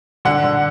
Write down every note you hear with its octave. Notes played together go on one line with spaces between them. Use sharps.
D3 F#5
D3